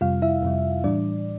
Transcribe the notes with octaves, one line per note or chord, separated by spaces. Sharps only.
F2 C3 G3 F4 F5
E4 E5
F2 C3 G3
A2 E3 G3 D4 D5